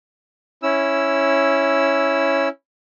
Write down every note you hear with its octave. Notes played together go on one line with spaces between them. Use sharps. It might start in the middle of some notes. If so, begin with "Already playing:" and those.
C#4 E4 E6